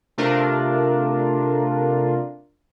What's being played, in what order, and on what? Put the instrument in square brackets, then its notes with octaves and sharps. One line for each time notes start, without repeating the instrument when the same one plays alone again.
[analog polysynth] C3 A3 D4 F4 A#4